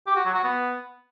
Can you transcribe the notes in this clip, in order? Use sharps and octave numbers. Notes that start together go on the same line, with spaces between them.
G4
F#4
F#3
F#4
B3